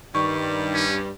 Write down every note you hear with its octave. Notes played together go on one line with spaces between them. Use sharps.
G2 D#3 G3 C#6
C#4